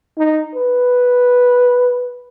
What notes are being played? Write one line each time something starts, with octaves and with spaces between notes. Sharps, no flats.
D#4
B4